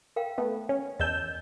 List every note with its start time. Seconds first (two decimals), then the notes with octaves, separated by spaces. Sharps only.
0.16 A#4 F5 G5
0.38 A3 B3
0.69 C#4
1.00 E2 D#5 A5 E6 G6